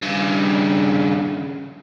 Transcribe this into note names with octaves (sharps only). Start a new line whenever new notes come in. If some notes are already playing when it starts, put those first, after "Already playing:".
G2 C#3